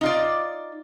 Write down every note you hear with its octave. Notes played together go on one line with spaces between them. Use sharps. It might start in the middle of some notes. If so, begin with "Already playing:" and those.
D#4 F4 D5